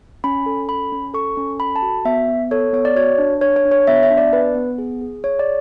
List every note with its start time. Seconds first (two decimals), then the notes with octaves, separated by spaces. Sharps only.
0.24 C#4 B5
0.46 A4
0.69 C#4 B5
0.92 C#4
1.14 A4 C#6
1.37 C#4
1.59 A4 B5
1.76 A5
1.82 F#4
2.05 B3 E5
2.29 B3
2.51 A4 C#5
2.73 B3 C#5
2.85 D5
2.96 F#4 C#5
3.18 D4
3.41 D4 C#5
3.56 C#5
3.65 D4
3.71 C#5
3.87 B3 E5
4.03 E5
4.11 D4
4.18 D5
4.33 B3 B4
4.55 B3
4.78 G#4
5.01 G#4
5.24 G#4 C#5
5.39 D5